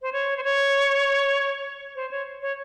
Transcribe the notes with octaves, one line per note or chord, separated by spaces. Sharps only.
C5
C#5
C5
C#5
C5
C#5
C#5